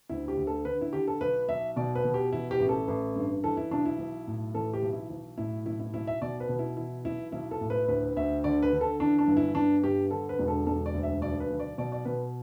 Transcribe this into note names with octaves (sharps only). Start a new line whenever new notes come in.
D2 E4
G4
D2
A4
D3 B4
E4
D3 G4
A4
B1 B4
B1 E5
B2 D5
B4
B2
G4
E3 E4
G4
A1
A4
A1
G2
E3 A4
E4
B1 D4
E4
B1
A2
E3 A4
G4
B1
E4
B1
A2 E4
B1 E4
E4
B1 E4
E5
B2 D5
B4
B2
E4
E3 E4
B1 E4
B1 E4
A4
A2
B4
D2 B4
D2 E5
D3 D5
B4
D3
A4
E3 D4
D4
G1
E4
G1 D4
G2 G4
D3 A4
B4
E1
A4
E1 A4
D5
D2
E5
B1 D5
B4
B1
D5
B2 D5
D5
B2 B4